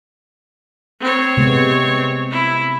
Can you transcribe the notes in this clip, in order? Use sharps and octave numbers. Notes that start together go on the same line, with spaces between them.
C4 C#5
C3 G#3 B3
E4